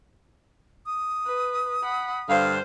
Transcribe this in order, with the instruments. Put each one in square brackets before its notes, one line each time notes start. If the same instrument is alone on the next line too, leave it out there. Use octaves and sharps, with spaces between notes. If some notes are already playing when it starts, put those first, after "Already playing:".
[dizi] D#6
[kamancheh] B4
F#5 B5
[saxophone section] G2 D3 F5 [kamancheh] C5